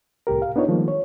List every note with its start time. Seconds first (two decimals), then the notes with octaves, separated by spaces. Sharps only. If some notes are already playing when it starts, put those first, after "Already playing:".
0.27 C2 A2 G4 A#4
0.42 F5
0.56 B3 D4 D#4 F4 C#5
0.68 D#3 F3 G3 G#3 A#3
0.88 C#5